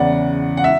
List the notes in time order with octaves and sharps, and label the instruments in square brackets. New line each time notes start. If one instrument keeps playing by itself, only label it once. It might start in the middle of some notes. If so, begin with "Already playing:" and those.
Already playing: [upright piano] E2 C#3 E3 D5 F#5
F#5
E5